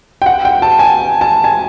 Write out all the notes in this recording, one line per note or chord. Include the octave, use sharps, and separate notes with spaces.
G5
F#5
G5
A5
G#5
A5
G#5